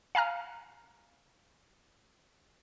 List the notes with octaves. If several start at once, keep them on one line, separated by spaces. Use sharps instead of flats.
F5 G#5 A#5 F6